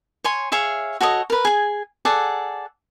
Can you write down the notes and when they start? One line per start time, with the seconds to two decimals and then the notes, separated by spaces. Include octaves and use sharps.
0.24 C#5 G#5 C6
0.52 G#4 C#5 E5 F5
1.01 F#4 A4 C#5 D#5
1.30 A#4 B4
1.45 G#4 G#5
2.05 G#4 A4 D5 F#5